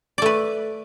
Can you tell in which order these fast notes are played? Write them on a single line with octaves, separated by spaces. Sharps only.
D5 A3 B4